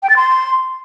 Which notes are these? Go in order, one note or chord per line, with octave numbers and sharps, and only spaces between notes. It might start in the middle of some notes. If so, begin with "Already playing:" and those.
G5
A6
C6